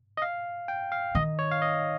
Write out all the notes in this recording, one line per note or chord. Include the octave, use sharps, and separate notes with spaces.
D#5
F5
G5
F5
D#3 D#5
C#5
F5
D#5